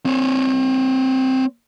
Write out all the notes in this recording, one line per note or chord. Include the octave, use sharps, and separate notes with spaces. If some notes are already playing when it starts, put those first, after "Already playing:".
C4 C#5